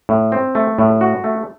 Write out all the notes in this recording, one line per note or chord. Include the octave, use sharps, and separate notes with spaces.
A2
C4
A3
A2
F#4
A3